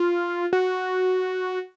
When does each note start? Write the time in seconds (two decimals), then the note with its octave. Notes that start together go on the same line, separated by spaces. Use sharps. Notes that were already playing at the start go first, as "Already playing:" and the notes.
Already playing: F4
0.53 F#4